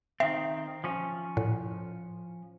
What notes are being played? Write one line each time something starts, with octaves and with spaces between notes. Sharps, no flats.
D#3 C4 E5
F3 C#4
A2